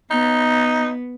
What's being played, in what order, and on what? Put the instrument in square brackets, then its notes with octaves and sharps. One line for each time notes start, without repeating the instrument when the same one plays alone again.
[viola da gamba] B3 [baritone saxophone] D#4